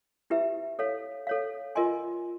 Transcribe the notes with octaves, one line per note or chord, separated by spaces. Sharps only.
E4 G4 B4 E5
A4 C#5 F5
A4 C#5 F5
F4 A#4 D#5 G#5 C6